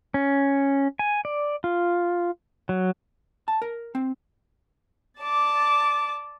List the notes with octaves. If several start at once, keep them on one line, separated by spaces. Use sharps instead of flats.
C#4
G#5
D5
F4
F#3
A5
A#4
C4
D5 A5 D6